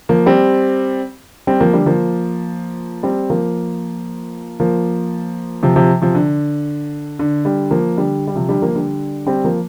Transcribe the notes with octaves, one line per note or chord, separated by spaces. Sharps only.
F3 A#3
G3 C4
G3 C4
F3 A#3
D3 G3
F3 A#3
G3 C4
F3 A#3
F3 A#3
C3 F3
C3 F3
C3 F3
D3
D3
D3 G3
F3 A#3
D3 G3
G3
C3 F3
D3 G3
F3 A#3
D3 G3
G3 C4
F3 A#3